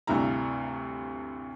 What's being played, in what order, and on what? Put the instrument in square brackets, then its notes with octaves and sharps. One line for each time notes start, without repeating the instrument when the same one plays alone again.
[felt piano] D2 G2 C3 E4 A#5